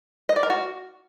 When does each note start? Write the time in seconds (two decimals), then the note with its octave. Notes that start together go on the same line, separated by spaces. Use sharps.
0.29 D#5
0.36 D5
0.43 A#4
0.50 F#4